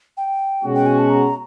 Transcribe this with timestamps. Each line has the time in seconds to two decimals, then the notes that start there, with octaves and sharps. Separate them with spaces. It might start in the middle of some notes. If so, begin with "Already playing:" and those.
0.17 G5
0.63 B2 G#3 C#4 F#4
0.75 G5
0.86 G#5
0.98 A5
1.10 A#5